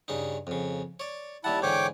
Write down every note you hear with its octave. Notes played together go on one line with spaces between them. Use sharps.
G2 C#3 D#4
F2 C#3
C#5 D5
D#2 G3 E4 F#5 A5
G#2 D3 E3 C#5 G5 D6